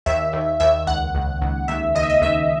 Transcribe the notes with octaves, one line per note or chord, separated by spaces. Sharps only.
D#2 E5
D#2
D#2 E5
C#2 F#5
C#2
C#2
D#2 E5
D#2 D#5
E5
D#5
D#2 E5